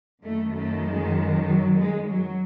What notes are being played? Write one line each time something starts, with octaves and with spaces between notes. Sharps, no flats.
F#2 D#3 A3
A3
G#3
F#3
G#3
F#3